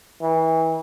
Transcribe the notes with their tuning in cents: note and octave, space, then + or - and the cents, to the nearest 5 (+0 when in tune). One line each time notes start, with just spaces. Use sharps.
E3 -30